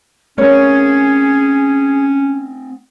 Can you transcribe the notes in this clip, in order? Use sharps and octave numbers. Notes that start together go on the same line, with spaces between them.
A3 C4 C#4 G#4 A#4 B4 C#5